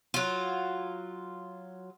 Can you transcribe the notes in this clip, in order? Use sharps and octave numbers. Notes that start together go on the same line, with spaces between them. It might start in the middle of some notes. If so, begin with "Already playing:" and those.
F#3 F4